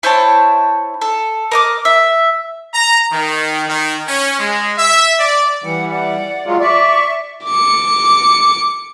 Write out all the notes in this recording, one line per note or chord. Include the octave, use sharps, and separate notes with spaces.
E4 C5 C#5 A5
A4
A#4 D#5 D6
E5
A#5
D#3
D#3
C#4
G#3
E5
D5
E3 G3 F#5
D5 F#5
F#3 G#3 F4
D5 E5 C#6
D6 C#7